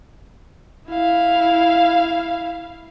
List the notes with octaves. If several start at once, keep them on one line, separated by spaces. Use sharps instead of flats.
E4 F5